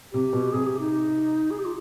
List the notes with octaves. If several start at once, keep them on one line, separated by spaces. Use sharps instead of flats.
C3 G4
B2
C3 G#4
G4
D#4
G#4
G4
F4